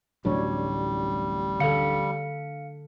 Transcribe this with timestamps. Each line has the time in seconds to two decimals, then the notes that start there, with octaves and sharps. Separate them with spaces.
0.25 D1 A1 F#3 G3 D4 C#5
1.60 D3 A4 F5 C#7